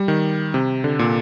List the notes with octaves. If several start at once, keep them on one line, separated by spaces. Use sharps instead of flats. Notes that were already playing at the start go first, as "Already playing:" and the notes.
Already playing: G3
D#3
C3
D3
A#2